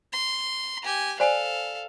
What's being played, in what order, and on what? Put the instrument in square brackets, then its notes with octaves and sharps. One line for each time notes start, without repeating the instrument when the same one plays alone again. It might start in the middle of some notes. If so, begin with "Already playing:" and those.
[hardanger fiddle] C6
G4 G#5
[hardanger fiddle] A4 F5 [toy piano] C5 D5 G#5